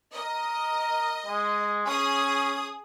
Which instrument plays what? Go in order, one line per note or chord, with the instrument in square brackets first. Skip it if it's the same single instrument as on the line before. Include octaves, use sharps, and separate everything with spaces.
[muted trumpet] A#4 [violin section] D#5
[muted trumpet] G#3
[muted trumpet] C#4 [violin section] G#4 D#6